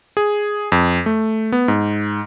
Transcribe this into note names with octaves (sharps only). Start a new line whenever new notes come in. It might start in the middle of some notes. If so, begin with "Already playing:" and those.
G#4
F2
A3
B3
G#2